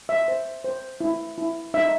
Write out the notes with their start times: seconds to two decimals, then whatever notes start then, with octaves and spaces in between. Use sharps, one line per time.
0.09 E5
0.28 C5
0.64 C5
1.01 E4
1.38 E4
1.74 D#4 E5